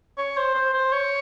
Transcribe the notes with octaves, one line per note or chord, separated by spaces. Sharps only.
C#5
C5
C5
C5
C#5